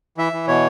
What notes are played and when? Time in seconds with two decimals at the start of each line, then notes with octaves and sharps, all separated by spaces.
0.18 E3 E5
0.33 E3
0.48 B2 C#5